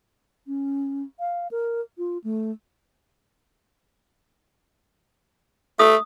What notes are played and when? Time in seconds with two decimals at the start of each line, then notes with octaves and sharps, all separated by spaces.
0.47 C#4
1.20 F5
1.51 A#4
1.98 F4
2.24 A3
5.79 A3 D#6